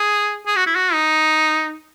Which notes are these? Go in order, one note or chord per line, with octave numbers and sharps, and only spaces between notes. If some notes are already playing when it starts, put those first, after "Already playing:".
Already playing: G#4
G#4
F#4
E4
F#4
D#4